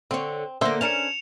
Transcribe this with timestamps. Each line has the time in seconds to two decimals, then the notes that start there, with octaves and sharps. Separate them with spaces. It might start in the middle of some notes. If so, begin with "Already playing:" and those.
0.11 D3 C4 C#5
0.61 D3 A#3 C5 E5
0.81 C#4 D4 A#4 C#7 E7 F7